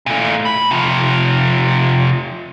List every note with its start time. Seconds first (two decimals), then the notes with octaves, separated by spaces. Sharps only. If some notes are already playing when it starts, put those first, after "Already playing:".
0.06 A#2 A3
0.45 B5
0.71 C3 F3